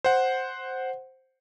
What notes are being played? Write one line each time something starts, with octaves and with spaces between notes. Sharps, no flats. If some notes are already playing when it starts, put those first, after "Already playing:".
C5 F#5